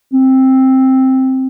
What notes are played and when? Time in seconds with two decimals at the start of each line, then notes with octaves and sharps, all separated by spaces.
0.13 C4